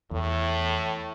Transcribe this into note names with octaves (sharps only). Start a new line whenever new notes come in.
E2 A2